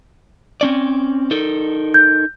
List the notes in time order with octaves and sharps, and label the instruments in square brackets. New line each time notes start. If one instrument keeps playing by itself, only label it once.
[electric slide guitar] C4 C#4 D5
D#4 A4 A#4
[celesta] G6